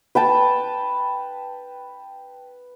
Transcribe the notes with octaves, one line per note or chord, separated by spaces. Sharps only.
B4 G5 A5